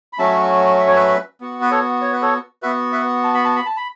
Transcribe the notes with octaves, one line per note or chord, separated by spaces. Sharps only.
B5
F#3 A3 C#4 F#4 E5 A5
E5
C#5
B4 E5
B3 F#4
B4
A4 C#5
C#5
B4
A4 C#5
B3 F#4 B4 E5
B4 E5
A5
B5
A5
B5
A5
B5